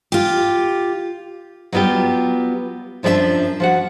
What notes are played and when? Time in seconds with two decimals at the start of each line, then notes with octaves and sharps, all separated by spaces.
0.12 F4 G4
1.72 F#3 G3 B3 F4 G4
3.03 F#2 F3 D4 G4 E5
3.60 F3 F#4 F#5